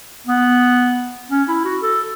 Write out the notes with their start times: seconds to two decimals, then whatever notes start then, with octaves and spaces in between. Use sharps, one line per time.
0.27 B3
1.31 C#4
1.48 E4
1.65 F#4
1.82 A4